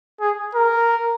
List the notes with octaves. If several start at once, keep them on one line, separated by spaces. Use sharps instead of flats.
G#4
A#4